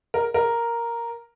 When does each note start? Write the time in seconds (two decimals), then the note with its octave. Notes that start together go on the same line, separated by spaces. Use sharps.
0.14 A#4
0.34 A#4